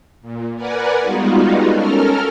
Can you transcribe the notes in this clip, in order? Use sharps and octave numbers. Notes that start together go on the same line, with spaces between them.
A#2
A#4 B4 D5 F#5 G#5
G3 G#3 B3 D#4 F4 F#4
C#4 A4 A#4 F6